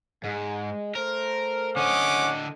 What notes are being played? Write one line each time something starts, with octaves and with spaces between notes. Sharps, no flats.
G#2 G#3
A3 A#4 C5
D3 C#4 D#5 F#5 D6